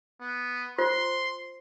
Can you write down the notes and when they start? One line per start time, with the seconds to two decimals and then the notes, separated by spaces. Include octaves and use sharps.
0.21 B3
0.78 F4 C5 C6